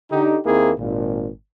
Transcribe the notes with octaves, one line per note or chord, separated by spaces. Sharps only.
D3 D#4 G4
D#2 A#3 C4 D#4 E4 G#4
G#1 A#2